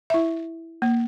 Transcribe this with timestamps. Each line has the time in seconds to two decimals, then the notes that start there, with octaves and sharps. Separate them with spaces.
0.10 E4 E5
0.82 A#3